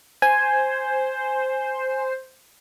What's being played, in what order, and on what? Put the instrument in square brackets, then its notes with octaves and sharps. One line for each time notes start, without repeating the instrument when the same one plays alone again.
[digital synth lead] C5 [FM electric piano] G#5